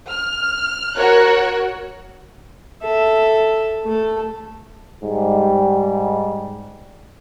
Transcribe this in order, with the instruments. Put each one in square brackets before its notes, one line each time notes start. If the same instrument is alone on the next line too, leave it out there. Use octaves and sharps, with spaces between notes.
[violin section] F6
F#4 A#4 C#5 F#6
[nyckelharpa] A4 E5
A3 A4
[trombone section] G#2 G3